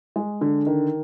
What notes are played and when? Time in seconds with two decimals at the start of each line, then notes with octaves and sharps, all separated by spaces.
0.16 G#3
0.41 D3
0.67 D#3